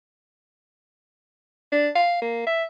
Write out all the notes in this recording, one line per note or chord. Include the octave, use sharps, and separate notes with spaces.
D4
F5
A#3
E5